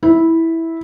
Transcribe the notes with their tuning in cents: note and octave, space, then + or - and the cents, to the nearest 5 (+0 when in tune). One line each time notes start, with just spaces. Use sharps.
E4 -10